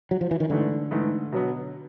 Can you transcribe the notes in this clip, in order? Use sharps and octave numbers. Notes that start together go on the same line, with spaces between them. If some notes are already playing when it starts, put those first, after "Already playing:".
F#3
F3
E3
D#3
G#2 D3 E3 A3
G#2 E3 A3
B2 F#3 B3